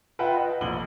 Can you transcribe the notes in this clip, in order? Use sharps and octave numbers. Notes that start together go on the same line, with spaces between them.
F4 B4 E5 F#5 G5
D#5
F1 A#1 D#7 F#7 G7